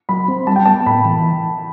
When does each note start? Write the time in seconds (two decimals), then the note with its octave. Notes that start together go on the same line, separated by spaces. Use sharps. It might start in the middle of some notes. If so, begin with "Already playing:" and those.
0.09 F#3 B5
0.28 C4
0.47 G3 A5
0.56 G5
0.66 B3 A5
0.86 A2 B5
1.05 E3